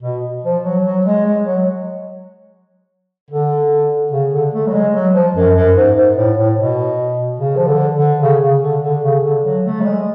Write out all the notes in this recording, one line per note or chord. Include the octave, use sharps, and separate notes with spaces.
B2
F3
F#3
F#3
G#3
G#3
F#3
D3
C#3
D3
A3
F#3
G#3
F#3
F3
F#2
F#2
G#2
G#2
A2
A2
B2
C#3
F3
D3
D3
C#3
C#3
D3
D3
C#3
D3
F#3
A3
F#3
G#3